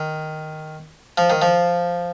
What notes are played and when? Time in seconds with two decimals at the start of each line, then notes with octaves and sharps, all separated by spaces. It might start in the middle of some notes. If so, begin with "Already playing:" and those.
Already playing: D#3
1.18 F3
1.30 D#3
1.42 F3